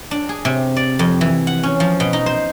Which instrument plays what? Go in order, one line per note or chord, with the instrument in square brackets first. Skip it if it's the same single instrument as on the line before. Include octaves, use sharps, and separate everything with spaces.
[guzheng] D4
G#4
C3
D5
F2
E3
F#5
C#4
F3
B2
D#4
C5